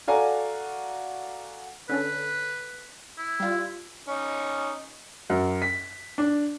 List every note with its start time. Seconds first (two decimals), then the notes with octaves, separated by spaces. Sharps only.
0.07 F#4 A4 D5 F5 G#5 A#5
1.89 D3 C#4 A4 B4
3.18 E4
3.40 G3 F4
4.08 C#4 D#4
5.30 F#2
5.62 B6
6.18 D4